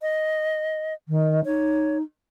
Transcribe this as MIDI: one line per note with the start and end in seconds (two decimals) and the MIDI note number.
0.02 0.94 75
1.08 1.44 51
1.45 2.01 63
1.45 1.98 73